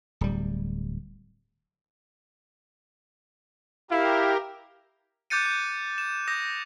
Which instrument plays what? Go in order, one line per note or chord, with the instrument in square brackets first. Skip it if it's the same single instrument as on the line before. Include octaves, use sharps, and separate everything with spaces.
[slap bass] D1 G3
[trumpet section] E4 F5 [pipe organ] G4 A#4
[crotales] D6 F#6 G6 A6 C#7 D#7
D6 G6
E7
D6 D#6 G6 A#6